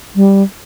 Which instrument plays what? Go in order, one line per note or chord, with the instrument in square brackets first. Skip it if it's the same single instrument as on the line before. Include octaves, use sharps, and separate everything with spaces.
[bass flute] G3